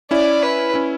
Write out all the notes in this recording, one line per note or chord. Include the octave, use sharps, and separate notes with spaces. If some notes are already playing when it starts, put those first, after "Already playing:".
C#4 E4 D5
B4
C#4 E4